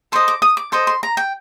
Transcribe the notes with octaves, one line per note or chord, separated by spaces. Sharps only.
A4 C5 D#5 C6
D6
D#6
D6
A4 C5 D#5 C6
C6
A#5
G5